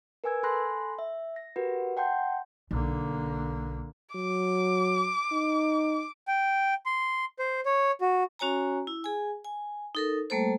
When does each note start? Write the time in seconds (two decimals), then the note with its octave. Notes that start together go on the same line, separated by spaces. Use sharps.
0.24 A#4 B4 G#5 E6 G#6
0.43 A4 G#5 B5 C6 F#6 A#6
0.99 E5
1.36 A#6
1.56 F#4 G4 A#4 B4 F#5
1.96 E5 F#5 G5 A5 C6 G6
2.71 B1 D3 A#3
4.15 F#3 D6
5.32 D#4
6.28 G5
6.86 C6
7.39 C5
7.66 C#5
8.01 F#4
8.39 C#4 F#4 C#5 G#5 A#5
8.87 E4
9.04 G#4 G#5
9.44 G#5
9.95 D#4 A4 A#4
10.30 G3 A3 A#3 A4 C5